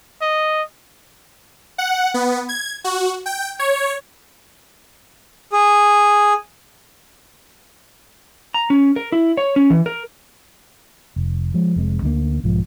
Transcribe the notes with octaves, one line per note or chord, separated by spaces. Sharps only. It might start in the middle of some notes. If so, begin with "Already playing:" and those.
D#5
F#5
B3
G#6
F#4
G5
C#5
G#4
A#5
C#4
A#4
E4
C#5
C#4
E3
A#4
F1
F3 G#3
F1 G#3 C4
D2 D3 E3 A#3
B1 G#2 F3